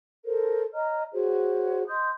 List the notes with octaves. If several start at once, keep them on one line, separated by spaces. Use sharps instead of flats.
A4 A#4 C5
C#5 D#5 A#5 F6
F#4 G#4 C5 C#5
D#5 C6 D#6 G6